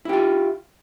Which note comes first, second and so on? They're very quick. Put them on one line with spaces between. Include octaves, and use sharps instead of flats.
E4 G4 F4